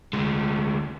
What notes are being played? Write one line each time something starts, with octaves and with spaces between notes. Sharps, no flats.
D2 G#3